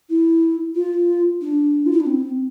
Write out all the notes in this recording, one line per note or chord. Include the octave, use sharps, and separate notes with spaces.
E4
F4
D4
F4
E4
D4
C4